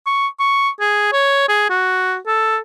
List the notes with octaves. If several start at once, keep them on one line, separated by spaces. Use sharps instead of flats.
C#6
C#6
G#4
C#5
G#4
F#4
A4